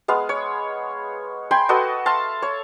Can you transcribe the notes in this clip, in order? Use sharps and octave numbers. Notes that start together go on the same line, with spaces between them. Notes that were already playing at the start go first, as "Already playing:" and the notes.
G#3 B3 F5
C#5
G5 G#5 B5 C6
F#4 A4 B4 D#5
E5 F5 A5 C6
C#5